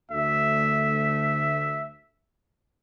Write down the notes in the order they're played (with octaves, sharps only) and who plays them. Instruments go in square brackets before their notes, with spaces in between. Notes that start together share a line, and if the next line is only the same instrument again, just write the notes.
[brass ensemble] D2 A3 [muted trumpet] E5